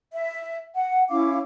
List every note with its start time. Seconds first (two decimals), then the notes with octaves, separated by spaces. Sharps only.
0.12 E5
0.75 F#5
1.09 C#4 E4 F5 D6